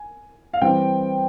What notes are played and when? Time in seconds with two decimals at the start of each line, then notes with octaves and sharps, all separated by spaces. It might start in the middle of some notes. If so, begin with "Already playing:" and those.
Already playing: G#5
0.53 F5
0.61 E3 G3 C4 G4 G5